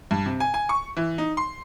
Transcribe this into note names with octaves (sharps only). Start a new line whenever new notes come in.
G2
C3
G#5
G#5
C#6
E3
D#4
C6